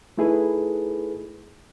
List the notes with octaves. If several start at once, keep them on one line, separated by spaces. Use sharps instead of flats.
A3 D#4 E4 G#4 A4 B4